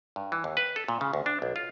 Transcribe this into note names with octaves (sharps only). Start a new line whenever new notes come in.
G2
E3
D#2
B4
A4
A#2
C#3
D2
D4
B1
F4